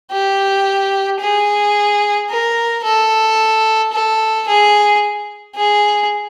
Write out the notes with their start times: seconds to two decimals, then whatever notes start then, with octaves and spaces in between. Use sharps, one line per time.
0.12 G4
1.20 G#4
2.30 A#4
2.84 A4
3.93 A4
4.48 G#4
5.56 G#4